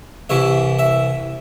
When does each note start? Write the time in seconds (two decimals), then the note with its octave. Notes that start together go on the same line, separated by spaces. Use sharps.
0.29 C2 C3 E3 E5
0.79 E5